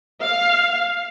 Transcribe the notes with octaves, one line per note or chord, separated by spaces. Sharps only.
F5